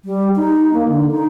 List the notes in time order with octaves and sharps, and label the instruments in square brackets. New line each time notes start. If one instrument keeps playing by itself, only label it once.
[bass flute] G3
D#4
A#3
D3
D#4